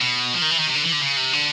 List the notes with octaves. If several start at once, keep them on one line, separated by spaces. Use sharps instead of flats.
B2
F3
D#3
E3
D#3
C3
D3
E3
D3
C#3
C3
D3